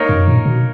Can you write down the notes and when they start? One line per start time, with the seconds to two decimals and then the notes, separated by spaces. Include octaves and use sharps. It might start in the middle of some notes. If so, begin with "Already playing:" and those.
Already playing: A#3 D#4 A#4 C#5
0.09 F#2
0.28 A#2
0.45 B2